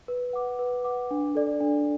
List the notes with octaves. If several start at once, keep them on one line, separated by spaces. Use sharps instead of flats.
B4
F#5 D6
B4
F#5 D6
D4
A4 D5
D4